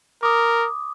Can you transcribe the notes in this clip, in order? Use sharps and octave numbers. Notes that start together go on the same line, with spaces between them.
A#4 D6 D#6